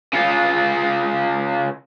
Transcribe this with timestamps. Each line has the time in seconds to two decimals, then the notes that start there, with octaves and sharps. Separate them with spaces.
0.13 C#3 F4